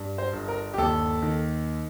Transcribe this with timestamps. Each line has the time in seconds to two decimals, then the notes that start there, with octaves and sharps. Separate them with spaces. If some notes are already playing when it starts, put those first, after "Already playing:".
Already playing: G2
0.18 C5
0.33 G1
0.48 A#4
0.74 G4
0.78 D#2 A4
1.22 D#3